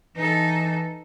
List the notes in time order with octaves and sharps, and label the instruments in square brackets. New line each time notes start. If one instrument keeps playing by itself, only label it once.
[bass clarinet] E3 [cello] D#4 A4